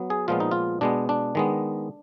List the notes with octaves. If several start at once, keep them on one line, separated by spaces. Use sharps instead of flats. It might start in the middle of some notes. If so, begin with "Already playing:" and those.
Already playing: F#3 B3
G#4
A#2 F3 G#3 B3 F4
D#4
F4
B2 G#3 B3 D4
D4
D#3 G#3 B3